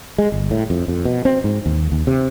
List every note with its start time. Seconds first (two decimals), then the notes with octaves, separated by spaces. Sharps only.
0.18 G#3
0.32 G1
0.51 A2
0.70 F2
0.88 F2
1.05 B2
1.25 C4
1.44 G#2
1.66 D#2
1.92 D#2
2.07 C3